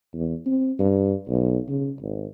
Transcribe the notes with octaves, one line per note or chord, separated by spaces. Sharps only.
E2
C4
G2
B1
C#3
G#1